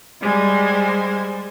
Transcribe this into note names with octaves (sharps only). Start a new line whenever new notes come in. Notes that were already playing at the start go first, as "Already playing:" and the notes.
G3 G#3 C5 G#5